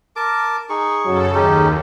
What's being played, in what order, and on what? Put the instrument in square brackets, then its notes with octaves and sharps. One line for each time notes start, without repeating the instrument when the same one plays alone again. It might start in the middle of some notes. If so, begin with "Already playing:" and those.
[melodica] A#4 A5 D6
D#4 G#4 C#6
[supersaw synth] F#2 C#3 A4 [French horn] F#3
[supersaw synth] D#2 [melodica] C#4 D#4 G4 [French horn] G#4